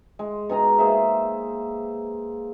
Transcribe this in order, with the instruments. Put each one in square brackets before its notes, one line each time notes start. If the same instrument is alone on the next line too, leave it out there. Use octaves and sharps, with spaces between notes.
[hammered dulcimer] G#3
B2 D#4 G#4 A#5
A#3 G#4 C5 E5